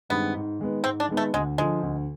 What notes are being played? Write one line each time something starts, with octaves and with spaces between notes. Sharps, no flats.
G2 D#3 G#3 B3 C4
G#2
D#3 G#3 B3
G#2 C4
D4
D#3 G#3 B3
A3
D2 G#3
D3 F3 G#3
D2